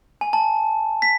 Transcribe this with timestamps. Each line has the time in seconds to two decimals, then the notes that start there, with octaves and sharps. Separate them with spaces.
0.21 G#5
0.33 A5
1.02 B6